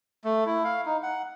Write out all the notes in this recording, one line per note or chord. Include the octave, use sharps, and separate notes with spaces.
A3
E4
F5
D#4
F#5